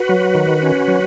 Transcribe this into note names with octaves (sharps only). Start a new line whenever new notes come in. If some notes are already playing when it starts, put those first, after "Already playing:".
Already playing: F#4 B4
F#3
D#3
C#4
F#3